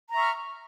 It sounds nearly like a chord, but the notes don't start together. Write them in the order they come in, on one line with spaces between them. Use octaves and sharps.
A#5 E5 C#6 F6